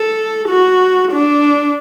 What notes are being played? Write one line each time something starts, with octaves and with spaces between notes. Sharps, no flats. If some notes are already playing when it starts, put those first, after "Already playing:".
Already playing: A4
F#4
D4